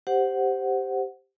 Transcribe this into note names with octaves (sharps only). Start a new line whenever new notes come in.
G4 C5 F#5